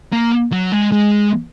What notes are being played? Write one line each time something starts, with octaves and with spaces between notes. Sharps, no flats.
A#3
F#3
G#3
G#3